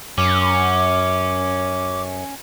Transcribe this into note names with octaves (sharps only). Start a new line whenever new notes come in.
F#2 C#4 D6